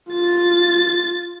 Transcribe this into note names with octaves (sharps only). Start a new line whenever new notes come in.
F4 A6